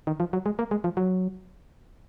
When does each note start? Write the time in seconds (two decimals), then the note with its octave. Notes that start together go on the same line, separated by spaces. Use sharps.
0.07 D#3
0.20 F3
0.33 F#3
0.46 G#3
0.59 A#3
0.71 G#3
0.84 F3
0.97 F#3